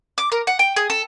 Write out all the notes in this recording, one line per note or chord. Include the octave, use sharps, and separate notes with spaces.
D6
A#4
F#5
G5
G#4
A4